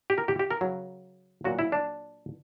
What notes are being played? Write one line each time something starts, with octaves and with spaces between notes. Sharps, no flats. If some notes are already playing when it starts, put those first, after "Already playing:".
G4
A#4
G4
G4
A#4
C#3 F#3
A#2 F#3 F#4
E4
D4